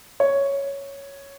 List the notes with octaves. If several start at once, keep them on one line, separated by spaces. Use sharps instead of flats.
C#5